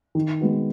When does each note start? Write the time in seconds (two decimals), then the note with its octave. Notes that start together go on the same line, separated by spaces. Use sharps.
0.15 D#3
0.41 G#3 B3 F#4